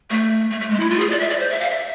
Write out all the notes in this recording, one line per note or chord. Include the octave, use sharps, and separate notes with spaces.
A3
A3
A3
G#3
E4
F4
G#4
D5
E5
D5
C5
E5
F5
E5